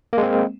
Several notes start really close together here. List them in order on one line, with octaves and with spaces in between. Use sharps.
A#3 G#3 C4